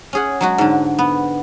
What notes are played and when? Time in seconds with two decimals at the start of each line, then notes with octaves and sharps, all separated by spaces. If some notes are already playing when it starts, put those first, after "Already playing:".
0.13 C#4 G#4 F#5
0.41 F#3 G#3 F#4
0.58 G#2 D3
0.99 B3